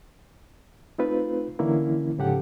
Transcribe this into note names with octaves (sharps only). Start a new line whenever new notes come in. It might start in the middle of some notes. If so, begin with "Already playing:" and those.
A3 C4 D#4 F4 B4
D3 E3 A#3 C#4 E4
G#2 C#3 F3 G4 A4 F#5